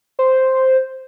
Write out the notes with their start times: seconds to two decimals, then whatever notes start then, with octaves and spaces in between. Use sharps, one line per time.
0.19 C5